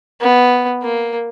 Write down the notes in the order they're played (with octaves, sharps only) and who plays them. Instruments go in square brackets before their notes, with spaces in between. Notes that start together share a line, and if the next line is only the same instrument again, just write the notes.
[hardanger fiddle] B3
A#3